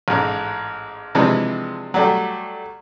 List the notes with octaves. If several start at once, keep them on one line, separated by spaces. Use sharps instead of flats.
A1 G#2
C3 E3 F3 G#3 D4
F#3 G3 A3